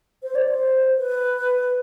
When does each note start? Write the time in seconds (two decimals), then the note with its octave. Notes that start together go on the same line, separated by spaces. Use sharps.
0.23 C5
0.35 D5
0.48 C5
0.98 B4